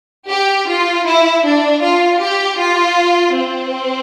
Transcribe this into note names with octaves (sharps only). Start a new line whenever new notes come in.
G4
F4
E4
D4
F4
G4
F4
C4